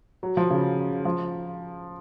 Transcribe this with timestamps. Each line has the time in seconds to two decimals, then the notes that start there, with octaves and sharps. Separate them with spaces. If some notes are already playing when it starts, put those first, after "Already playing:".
0.23 F#3
0.37 F3
0.50 C#3
1.05 F3